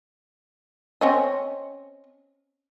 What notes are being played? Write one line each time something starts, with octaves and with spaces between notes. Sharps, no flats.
C4 C#4 D#5